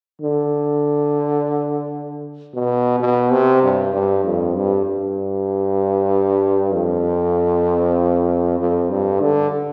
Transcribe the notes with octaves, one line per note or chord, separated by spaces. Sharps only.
D3
B2
B2
C3
G2
G2
F2
G2
G2
F2
F2
G2
D3